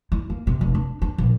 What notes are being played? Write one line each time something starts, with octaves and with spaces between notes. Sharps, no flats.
E4
A#3
C3
F1
D4
D4
A#1